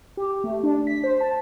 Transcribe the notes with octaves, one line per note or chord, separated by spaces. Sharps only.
G4
A3
D4
B6
C5
A5